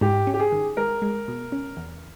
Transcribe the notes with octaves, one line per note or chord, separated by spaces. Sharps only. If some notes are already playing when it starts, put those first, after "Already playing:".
G#2 G4
C#4
G4
G#4
D#3
G#3 A#4
G#3
B2
C#4
E2